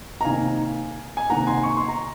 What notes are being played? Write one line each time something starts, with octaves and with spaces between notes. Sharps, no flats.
A#5
C3 D#3 A#3 D#4 F5 G#5
G#5
C3 D#3 A#3 F#5 A#5
G#5 C6
C#6
C6
A#5